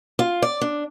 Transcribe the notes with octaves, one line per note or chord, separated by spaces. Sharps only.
F4
D5
D4